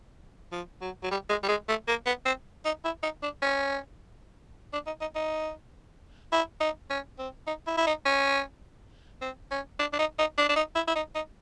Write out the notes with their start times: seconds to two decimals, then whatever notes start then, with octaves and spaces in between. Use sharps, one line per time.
0.52 F3
0.81 F#3
1.03 F#3
1.11 G3
1.29 G#3
1.43 G3
1.49 G#3
1.69 A3
1.88 A#3
2.06 B3
2.26 C4
2.65 D#4
2.85 E4
3.03 D#4
3.23 D4
3.42 C#4
4.73 D4
4.87 D#4
5.01 D#4
5.15 D#4
6.32 E4
6.60 D#4
6.90 C#4
7.19 C4
7.47 D#4
7.67 E4
7.77 E4
7.87 D#4
8.06 C#4
9.21 C4
9.51 C#4
9.79 D4
9.93 D4
9.99 D#4
10.19 D#4
10.38 D4
10.49 D4
10.56 D#4
10.76 E4
10.87 E4
10.95 D#4
11.15 D#4